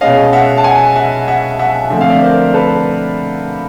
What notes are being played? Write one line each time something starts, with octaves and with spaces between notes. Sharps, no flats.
B2 G#3 C#4 D#5 F5
E5 F#5
A5
F#5 G#5
E5 F#5
E5 F#5
E5 F#5
D3 F3 A3 C4 E5
F5
D5 E5
A#4 C5
A4 B4